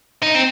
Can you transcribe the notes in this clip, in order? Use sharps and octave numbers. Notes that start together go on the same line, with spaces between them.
D#4
C4